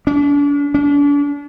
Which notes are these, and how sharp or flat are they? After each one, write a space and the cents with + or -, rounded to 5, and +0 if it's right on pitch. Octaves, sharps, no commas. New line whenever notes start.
D4 -40
D4 -40